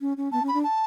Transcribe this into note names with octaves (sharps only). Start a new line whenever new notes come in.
C#4
C#4
B3 A5
C#4
B5
D4
A5